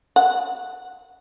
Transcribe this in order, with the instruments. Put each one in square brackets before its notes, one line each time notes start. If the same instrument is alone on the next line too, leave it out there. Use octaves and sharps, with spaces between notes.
[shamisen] F#5